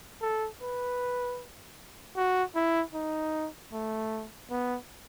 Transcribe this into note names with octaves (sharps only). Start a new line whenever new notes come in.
A4
B4
F#4
E4
D#4
A3
B3